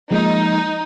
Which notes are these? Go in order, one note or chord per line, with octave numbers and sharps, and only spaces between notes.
F3 G#3 A#3 D#4